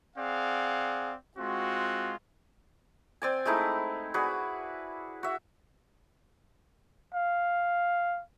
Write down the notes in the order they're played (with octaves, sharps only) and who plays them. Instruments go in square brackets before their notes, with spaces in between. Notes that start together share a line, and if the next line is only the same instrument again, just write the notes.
[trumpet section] C4 G#4 D5 F5 F#5
G#3 C4 F4 F#4
[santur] C4 D5 G#5
G#3 A3 D#4 E4
F#4 G#4 B4 D5
F#4 E5
[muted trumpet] F5